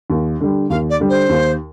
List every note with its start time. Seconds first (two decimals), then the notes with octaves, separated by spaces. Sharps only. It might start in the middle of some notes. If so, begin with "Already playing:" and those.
0.10 D#2
0.41 D3 G3
0.70 D#2 F5
0.89 D5
1.00 D3 G3
1.09 C5
1.29 D#2